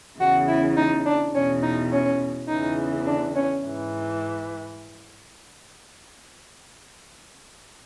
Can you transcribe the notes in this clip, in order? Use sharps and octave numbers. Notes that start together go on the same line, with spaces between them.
E2 C#3 E3 F#4
E4
D#4
D4
E2 B2 C#4
D#4
C#4
E2 C#3 E3 D#4
D4
C#4
G#2 E3